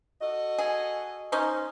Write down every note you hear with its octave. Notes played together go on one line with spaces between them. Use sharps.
F#4 A4 D#5
G#4
C#4 D#4 C5